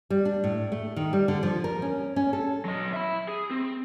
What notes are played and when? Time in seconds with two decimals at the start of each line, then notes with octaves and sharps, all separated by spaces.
0.10 G3
0.25 D4
0.44 A2
0.72 A3
0.96 D#3
1.13 G3
1.28 D3
1.43 F3
1.64 A#4
1.82 C#4
2.16 C#4
2.33 A4
2.65 F#3 D#5
2.93 E5 B5
3.28 G#4
3.51 C4